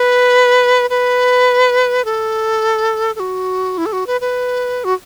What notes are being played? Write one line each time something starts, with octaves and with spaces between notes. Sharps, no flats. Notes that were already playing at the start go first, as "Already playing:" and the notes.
Already playing: B4
B4
A4
A4
F#4
E4
A4
F#4
B4
B4
F#4